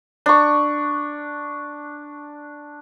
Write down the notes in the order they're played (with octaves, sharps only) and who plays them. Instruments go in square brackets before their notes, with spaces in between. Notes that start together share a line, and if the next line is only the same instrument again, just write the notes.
[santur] D4 C#6